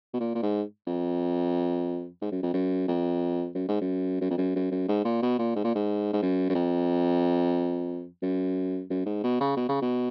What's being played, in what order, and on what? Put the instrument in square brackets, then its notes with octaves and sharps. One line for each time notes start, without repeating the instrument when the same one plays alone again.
[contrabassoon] B2
A#2
A#2
G#2
F2
G#2
F#2
F2
F#2
F2
F#2
G#2
F#2
F#2
F2
F#2
F#2
F#2
G#2
A#2
B2
A#2
G#2
A#2
G#2
G#2
F#2
F#2
F2
F#2
F#2
G#2
B2
C#3
B2
C#3
B2